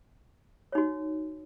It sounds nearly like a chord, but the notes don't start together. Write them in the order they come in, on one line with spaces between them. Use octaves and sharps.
C#5 D#4 F#4